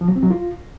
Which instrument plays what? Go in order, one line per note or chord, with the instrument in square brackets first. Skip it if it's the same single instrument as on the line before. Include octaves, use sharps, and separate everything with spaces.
[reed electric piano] F3
F#3
C4
F#3
F4